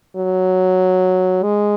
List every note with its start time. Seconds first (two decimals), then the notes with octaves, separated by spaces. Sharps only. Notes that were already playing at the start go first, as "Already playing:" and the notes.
0.16 F#3
1.43 G#3